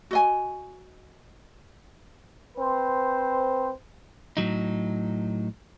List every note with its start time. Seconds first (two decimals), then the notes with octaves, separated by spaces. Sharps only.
0.11 F#4 D#5 G#5
2.57 C4 B4 C5
4.37 A2 F#3 D#4